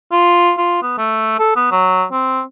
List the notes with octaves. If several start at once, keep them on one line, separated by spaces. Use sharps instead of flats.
F4
F4
B3
A3
A4
B3
F#3
C4